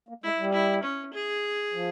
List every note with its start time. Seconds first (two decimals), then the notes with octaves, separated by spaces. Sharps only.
0.09 A#3
0.23 G#3 E4
0.39 G3
0.53 E4
0.83 C#4
1.13 G#4
1.73 F3